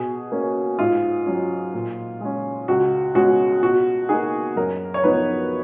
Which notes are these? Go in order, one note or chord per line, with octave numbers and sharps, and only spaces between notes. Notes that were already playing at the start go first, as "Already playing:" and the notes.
Already playing: B2 G#4
A#3 C#4
G#2 F4
F#3 C#4
A#2
G#3 C#4
C#2 F#4
B2 G#3 C#4 F#4
B2 F#4
A#3 D#4 G#4
F#2 A#4
C#5
F3 B3 D#4 B4